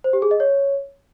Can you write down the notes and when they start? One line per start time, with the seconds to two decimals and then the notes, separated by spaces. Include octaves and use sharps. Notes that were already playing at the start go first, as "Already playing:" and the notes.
0.04 C5
0.13 G4
0.22 G#4
0.31 D#5
0.40 C#5